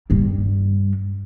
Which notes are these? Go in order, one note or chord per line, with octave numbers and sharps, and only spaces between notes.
G2 G3